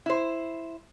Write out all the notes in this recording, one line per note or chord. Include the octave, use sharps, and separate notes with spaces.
E4 C5